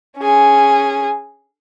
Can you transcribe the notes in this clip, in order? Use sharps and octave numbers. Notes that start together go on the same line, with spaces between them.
C#4 G#4